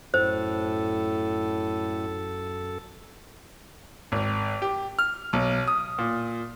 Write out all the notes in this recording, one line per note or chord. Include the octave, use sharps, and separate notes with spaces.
F#2 A2 A4 C5
G#1
G4
F6
B1
D#6
A#2